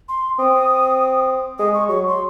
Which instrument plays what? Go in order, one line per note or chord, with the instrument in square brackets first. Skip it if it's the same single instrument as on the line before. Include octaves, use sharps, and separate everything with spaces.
[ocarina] C6
[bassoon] C4 [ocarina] D#6
[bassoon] G#3 [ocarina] D#6
[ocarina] C#6
[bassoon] F#3 [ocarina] C#6
[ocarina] C6